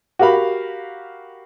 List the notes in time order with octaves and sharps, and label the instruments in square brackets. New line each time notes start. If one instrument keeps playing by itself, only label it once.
[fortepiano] F#4 G4 A#4 F5 B5